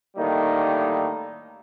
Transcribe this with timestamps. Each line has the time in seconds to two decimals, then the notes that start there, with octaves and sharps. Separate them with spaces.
0.16 A2 D3 D#3 G3 A#3 D#4